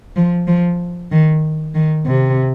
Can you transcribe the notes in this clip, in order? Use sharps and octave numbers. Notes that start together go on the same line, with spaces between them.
F3
F3
D#3
D#3
C3